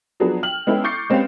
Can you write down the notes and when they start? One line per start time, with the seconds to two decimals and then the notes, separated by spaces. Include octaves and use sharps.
0.20 F3 F#3 B3 D4 G#4
0.43 G5 F6 F#7
0.67 G#3 B3 C#4 E4 A4 G5
0.84 C#6 D6 G6 A6 C7 C#7
1.10 G#3 C4 C#4 G4 B4 F5